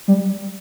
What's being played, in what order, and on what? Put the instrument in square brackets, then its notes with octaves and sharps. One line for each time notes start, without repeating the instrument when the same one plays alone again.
[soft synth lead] G3